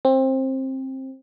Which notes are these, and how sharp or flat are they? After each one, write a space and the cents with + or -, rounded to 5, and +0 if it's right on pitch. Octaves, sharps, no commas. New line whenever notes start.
C4 +20